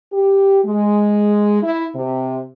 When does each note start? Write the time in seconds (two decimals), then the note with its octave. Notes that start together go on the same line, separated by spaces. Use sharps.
0.13 G4
0.65 G#3
1.62 E4
1.95 C3